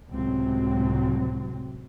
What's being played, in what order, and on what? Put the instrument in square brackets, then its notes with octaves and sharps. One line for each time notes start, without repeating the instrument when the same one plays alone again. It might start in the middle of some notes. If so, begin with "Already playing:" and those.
[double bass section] C#2 A2 C3 F#3 C4